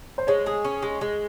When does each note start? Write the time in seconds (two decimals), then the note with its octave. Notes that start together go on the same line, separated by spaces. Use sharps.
0.18 C5
0.27 G#3 C#5
0.46 G#4
0.64 C#4
0.83 G#3
1.01 G#3